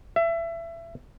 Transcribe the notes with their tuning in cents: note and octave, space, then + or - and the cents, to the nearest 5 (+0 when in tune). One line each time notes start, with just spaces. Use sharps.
E5 +25